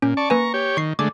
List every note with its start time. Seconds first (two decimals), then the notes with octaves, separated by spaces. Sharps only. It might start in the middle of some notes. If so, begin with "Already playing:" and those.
0.02 A#2 C#4
0.17 D5 A5 C#6
0.30 A#3 B4 G#5 A#5 C#6
0.54 G4 C#5
0.77 D#3 C#6 C7
0.99 D3 G#3 A3 D6